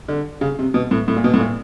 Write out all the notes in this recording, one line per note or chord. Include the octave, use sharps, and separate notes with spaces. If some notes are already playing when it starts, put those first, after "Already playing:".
D3
C#3
C3
B2
A2
A2
A#2
B2
A2
A#2